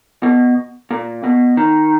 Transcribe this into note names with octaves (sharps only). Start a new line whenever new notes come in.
B2
A#2
B2
D#3